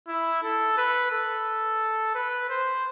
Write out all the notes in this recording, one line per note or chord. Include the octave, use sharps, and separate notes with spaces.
E4
A4
B4
A4
B4
C5